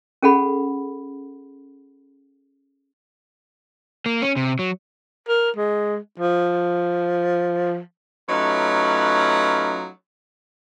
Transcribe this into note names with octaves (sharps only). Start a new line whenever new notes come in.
C#4 G#4 A4 F#5 B5
A#3
C#4
C3
F#3
A#4
G#3
F3
F#3 A3 C#4 D#4 F4 B4